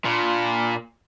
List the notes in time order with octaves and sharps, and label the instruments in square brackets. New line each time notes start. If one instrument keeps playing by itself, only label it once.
[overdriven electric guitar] A#2 [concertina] D4 F4 B5